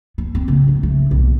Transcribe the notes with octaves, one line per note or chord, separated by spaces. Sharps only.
B3
C4
C#3
F#3
A3
B1